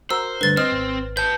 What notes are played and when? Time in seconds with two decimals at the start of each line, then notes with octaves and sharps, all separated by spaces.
0.11 F#4 A#4 C5 E6
0.41 D2 G2 D3 B4 A6
0.57 C4 C5 D#5 F6
0.72 G#1
1.17 B4 A5 G6